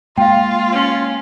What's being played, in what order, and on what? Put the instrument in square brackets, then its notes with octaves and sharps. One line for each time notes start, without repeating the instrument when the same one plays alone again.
[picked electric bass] G#3 A#3 [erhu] F4 [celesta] F5 G5
[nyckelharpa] C#4